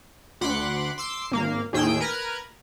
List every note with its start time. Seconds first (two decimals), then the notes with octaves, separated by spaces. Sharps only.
0.41 D2 F#5 B5 C6 D6 F#6
0.98 C6 D6 E6 C7
1.31 G#1 A#3 F5
1.73 D#2 A2 G#4 G5 E6 G6
2.01 A#4 B4 A#5 F6 F#6 G#6